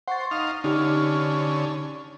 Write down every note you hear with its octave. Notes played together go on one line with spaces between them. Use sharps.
C5 F#5 C#6 A6
D#4 F5
D3 C#4 D#4 G4 F6